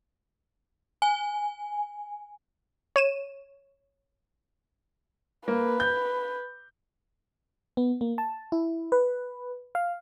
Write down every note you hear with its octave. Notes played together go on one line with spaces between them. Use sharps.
G#5
C#5 D#7 E7
A#3 B4
G6
B3
A#3
A5
E4
B4
F5